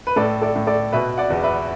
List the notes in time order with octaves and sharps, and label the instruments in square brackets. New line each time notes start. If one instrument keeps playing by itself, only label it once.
[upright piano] B4
A2 A4 D5
A4 D5
A2
A4 D5
B2 B4 E5
D5 F#5
E2
B4 E5